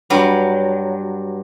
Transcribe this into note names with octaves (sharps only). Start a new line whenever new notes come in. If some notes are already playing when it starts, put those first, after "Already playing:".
G2 F#3